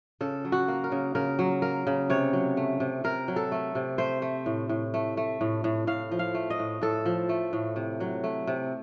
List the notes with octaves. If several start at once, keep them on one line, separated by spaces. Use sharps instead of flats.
C#3 A4
F#3
F#4
A#3
A#4
C#3
C#3 A#4
F#3
A#3 A#4
C#3
C3 C#5
F#3
A3
C3
C3 A#4
F#3
A4
A3
C3
A3 C5
A3
A2
A2
A3
A3
A2
A2
A2 F5
F3
F5
A3
D#5
A2
A2 A4
F3
A3
A2
C3
F#3
A3
C3